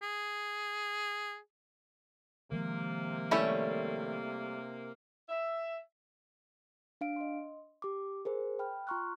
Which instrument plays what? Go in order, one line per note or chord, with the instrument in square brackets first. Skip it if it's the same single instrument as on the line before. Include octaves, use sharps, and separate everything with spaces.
[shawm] G#4
[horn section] C3 A#3 [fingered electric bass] D#3 F3 G#3
[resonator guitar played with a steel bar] G3 A3 [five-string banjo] C#4 E4 C#5
[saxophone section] E5
[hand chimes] D4 F5 D7
D#5 C6
G4 D6
G#4 A#4 C5
G5 B5 F6
F4 A#5 C6 C#6 F6 F#6